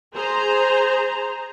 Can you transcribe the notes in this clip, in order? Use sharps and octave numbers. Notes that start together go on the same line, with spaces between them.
G#4 C5 A#5